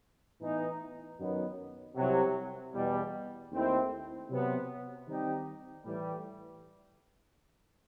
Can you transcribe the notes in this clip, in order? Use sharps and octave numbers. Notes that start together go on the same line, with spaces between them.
A2 E3 B3 D#4
F#2 D#3 F#3 B3
C2 C3 F#3
E2 B2 G3
D#2 D#3 A3 C4 E4
C3 F#3 B3
D#3 G3 C4 D#4 G4
A2 E3 G3